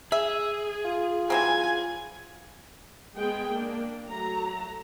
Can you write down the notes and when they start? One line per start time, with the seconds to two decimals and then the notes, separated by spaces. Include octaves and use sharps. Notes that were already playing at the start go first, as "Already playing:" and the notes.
0.12 G#4 E5
0.85 F4
1.30 E3 F#3 C4 G#5 G#6
3.16 G#3 B3 G#4 G5
3.52 A#3 D4
4.07 F#3 A3 A#5